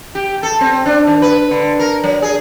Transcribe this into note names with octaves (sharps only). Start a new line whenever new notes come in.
G4
A4
C4
D4
D#3
B4
D3
A#4
F#3
G#4